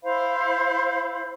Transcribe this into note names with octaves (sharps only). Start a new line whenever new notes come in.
E4 C5 F5 B5